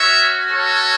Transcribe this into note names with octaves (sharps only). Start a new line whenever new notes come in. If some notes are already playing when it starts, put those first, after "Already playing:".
Already playing: C#4 F#4 C#5 E5
A4 C#5